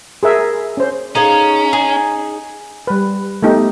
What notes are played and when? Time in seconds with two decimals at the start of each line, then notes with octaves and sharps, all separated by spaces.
0.23 G#4 A#4 E5
0.77 C#4 C5
1.15 C#4 D#4 G#4 F5 A#5
1.73 D#4 G#4
2.87 G3 B4
3.43 A3 B3 D#4 G4